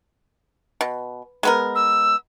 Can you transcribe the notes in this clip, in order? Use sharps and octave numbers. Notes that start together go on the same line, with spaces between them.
B2
G#3 B3 A#4
E6